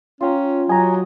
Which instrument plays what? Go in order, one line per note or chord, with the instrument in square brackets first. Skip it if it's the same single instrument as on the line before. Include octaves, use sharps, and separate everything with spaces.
[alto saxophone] C#4 [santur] F4 G5 A#5
[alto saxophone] F#3 [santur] F#4 G4 D#5 [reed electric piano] G#5 A#5